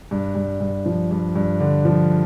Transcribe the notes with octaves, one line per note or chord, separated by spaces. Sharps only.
G2
G2
G2
F3
G2
G2
D3
F3